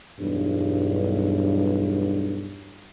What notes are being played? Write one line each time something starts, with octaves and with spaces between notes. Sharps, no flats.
B1 E2 G2